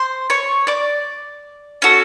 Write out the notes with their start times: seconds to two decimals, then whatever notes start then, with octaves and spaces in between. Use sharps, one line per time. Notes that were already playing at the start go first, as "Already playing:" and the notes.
Already playing: C5 C6
0.30 C#5 C#6
0.67 D5 D6
1.82 C#4 F#4 A4